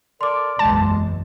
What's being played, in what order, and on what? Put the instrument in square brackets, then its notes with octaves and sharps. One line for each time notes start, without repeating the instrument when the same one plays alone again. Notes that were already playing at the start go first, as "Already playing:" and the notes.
[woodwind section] A4 A#4 D5 [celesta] C6 D6
[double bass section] F#1 B1 E2 [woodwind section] G#3 [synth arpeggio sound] A5